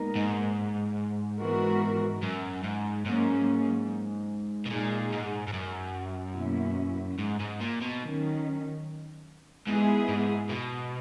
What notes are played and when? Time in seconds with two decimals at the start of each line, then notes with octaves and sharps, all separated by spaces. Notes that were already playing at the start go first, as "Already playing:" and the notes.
Already playing: A#2 G#3 B3 D#4 A#4
0.15 G#2
1.40 E3 G#3 B3 F#4 A#4
2.23 F#2
2.64 G#2
3.06 G#2 F#3 A#3 C#4
4.65 B2
4.70 A#2 G#3 D#4 G#4
5.13 G#2
5.48 G#2
5.53 F#2
6.35 B2 F#3 A#3 C#4 E4
7.18 G#2
7.40 G#2
7.61 A#2
7.81 B2
8.02 D#3 F#3 C#4
9.67 G#2 G#3 B3 E4 G#4
10.08 G#2
10.49 B2